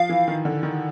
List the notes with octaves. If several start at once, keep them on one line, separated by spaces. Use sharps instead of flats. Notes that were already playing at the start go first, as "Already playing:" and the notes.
Already playing: F3 F5
E3
D#3
D3
D#3